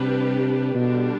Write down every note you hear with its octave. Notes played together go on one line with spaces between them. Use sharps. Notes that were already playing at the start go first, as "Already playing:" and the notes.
Already playing: C3 G3 D4 G4 B4
B2 D3 G3 D4